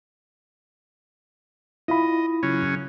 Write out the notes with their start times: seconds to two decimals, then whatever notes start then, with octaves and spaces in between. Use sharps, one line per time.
1.88 E4 F4 D#5 B5
2.43 C#3 F#3 C#4